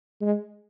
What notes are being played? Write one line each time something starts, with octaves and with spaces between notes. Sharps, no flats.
G#3